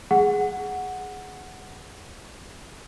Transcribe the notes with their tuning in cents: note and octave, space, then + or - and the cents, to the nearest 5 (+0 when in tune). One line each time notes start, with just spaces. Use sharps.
G#4 +0 F#5 +0